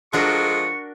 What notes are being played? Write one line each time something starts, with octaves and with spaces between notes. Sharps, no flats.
F3 G#3 D4 F#4 A4 A#4 C#6